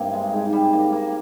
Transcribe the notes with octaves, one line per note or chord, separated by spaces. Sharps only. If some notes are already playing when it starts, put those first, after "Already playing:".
Already playing: G2 C3 A#3
G#3
G#2
G3
A#3
A#3